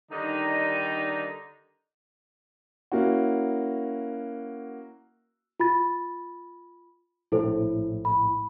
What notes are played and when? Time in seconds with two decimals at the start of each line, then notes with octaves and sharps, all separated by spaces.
0.11 D3 D#3 G3 D#4
2.92 A#3 C#4 E4 F#4
5.60 F4 B5 A6
7.32 A#1 A2 E4 A4 C5
8.05 B5